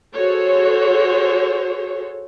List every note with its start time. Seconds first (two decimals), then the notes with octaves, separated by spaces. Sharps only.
0.14 F#4 G#4 A4 C5 C#5